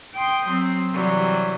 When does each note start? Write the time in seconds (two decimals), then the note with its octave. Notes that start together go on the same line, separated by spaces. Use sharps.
0.15 G5 C6 D#6 G6
0.47 F#3 C4
0.92 C3 E3 F#3 G3